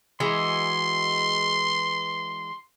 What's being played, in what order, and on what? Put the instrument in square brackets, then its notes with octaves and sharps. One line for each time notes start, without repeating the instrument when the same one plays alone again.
[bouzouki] E3 G#3 F#4 [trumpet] C6